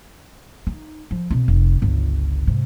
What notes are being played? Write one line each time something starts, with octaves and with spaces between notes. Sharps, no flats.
D#4
F3
B2 C4
F1
G1 C#2
G#2 C3